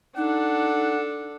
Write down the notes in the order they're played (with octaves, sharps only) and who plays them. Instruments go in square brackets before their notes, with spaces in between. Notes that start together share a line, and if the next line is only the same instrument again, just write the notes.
[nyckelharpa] D4 A4 [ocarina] D#4 [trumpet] F#5